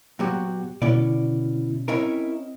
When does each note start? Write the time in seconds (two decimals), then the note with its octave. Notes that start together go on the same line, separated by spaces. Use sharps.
0.19 A#2 F#3 B3 F#4 G4
0.82 B2 D3 B3 C#4 E4 D5
1.88 C4 C#4 E4 A#4 D#5